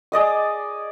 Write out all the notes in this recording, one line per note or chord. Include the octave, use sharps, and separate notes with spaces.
G#4 D5 D#5 D#6